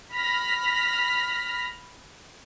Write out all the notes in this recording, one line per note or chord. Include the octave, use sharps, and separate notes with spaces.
B5 F6 A#6 B6